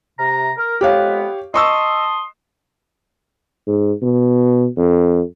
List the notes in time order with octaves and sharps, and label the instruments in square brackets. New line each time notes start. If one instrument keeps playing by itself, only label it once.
[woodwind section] C3 A#5
A#4
[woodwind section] F2 G#3 B3 [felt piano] G4 C#5 F5
[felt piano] D#5 C#6 E6 [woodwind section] A5 C6 D#6
[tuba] G#2
B2
F2